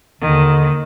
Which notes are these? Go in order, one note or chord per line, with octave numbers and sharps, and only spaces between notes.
D#2 D3 D#3